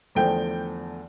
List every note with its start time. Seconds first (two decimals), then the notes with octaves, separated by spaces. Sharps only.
0.15 E2 D3 F3 A3 G5